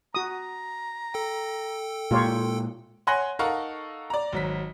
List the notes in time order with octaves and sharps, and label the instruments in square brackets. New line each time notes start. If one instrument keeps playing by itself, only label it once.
[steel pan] F#4 D#6 [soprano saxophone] A#5
[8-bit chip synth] A4 G5
[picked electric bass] A#2 G#3 A#3 [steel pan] F4 G4 C#5
[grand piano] C#5 F#5 G#5 C6 F#6 A#6
D#4 A4 A#4 F5 F#5 C#6
D5 A#5
G#1 F#3 B6